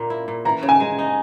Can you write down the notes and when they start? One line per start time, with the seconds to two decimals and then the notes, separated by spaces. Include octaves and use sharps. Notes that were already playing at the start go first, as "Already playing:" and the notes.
Already playing: A#2 A#3 A#5
0.10 E4
0.28 A#2
0.45 E3 A#5
0.63 C#3
0.69 G#5
0.80 G#3
0.99 D#4